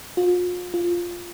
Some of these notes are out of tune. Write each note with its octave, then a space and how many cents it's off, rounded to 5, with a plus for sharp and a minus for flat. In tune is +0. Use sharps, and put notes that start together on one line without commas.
F4 +40
F4 +0